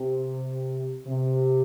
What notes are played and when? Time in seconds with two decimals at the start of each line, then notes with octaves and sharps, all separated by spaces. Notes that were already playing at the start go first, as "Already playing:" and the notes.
Already playing: C3
1.06 C3